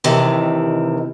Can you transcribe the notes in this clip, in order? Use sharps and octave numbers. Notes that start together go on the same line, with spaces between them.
D#2 C3 D#3 E3